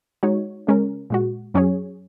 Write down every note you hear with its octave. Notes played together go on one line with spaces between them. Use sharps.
G#3 D#4 F#4 C#5
C#3 G#3 C#4 A#4
A#2 G#3 F#4
F#2 F#3 C#4 G#4 C#5